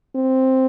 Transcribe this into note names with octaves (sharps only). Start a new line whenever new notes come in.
C4